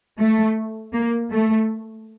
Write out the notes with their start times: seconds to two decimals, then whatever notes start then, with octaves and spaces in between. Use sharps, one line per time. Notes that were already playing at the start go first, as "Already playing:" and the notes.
0.20 A3
0.93 A#3
1.31 A3